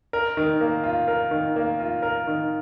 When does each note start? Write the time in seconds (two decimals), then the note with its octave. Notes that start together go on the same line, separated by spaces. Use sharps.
0.13 A#4
0.37 D#3
0.61 A#3
0.84 F4
1.08 A#4
1.31 D#3
1.56 A#3
1.80 F4
2.02 A#4
2.27 D#3